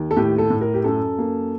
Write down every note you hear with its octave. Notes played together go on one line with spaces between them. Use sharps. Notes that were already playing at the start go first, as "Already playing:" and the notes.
Already playing: D#2
A4
A2 G4
A4
A2
A#4
G4
F#2 A4
A#3